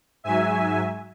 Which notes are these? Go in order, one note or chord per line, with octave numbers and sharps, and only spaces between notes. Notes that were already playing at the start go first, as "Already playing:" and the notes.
G#2 F#3 E5 G#5